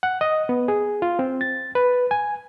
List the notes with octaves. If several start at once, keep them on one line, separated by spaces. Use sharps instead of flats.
F#5
D#5
B3
G#4
F4
C4
A6
B4
G#5